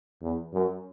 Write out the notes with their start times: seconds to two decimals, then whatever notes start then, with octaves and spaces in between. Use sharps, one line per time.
0.22 E2
0.53 F#2